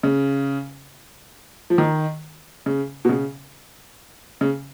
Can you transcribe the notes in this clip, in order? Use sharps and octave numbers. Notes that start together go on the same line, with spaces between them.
C#3
F3
D#3
C#3
B2
C#3
C#3